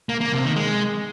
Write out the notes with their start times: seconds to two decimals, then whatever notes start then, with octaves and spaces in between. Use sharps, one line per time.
0.09 A#3
0.21 A#3
0.32 C3
0.44 D#3
0.56 G#3